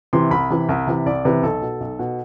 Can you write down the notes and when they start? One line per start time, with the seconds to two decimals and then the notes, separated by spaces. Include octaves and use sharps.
0.13 C3 E3 C6
0.31 C2 B5
0.50 C3 E3
0.69 C2
0.87 C3 E3
1.06 C2 D5
1.25 C3 E3 B4
1.43 B1 A4
1.62 B2
1.81 B1
1.99 B2